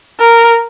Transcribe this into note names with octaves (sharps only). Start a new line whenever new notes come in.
A#4